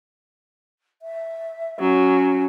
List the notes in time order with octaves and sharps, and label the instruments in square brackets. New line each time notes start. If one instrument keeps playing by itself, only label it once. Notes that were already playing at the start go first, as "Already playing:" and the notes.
[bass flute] E5
[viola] F#3 [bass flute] C#4